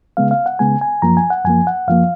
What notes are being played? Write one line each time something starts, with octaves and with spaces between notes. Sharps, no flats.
C#3 G#3 B3 F5
F5
F#5
C#3 G#3 B3 G#5
G#5
F#2 F3 A#3 A#5
G#5
F#5
F#2 F3 A#3 G#5
F#5
F#2 F3 A#3 F5